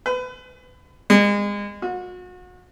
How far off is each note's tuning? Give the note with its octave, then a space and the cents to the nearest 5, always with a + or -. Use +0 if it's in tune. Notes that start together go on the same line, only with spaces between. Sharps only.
B4 +30
G#3 -30
F#4 -35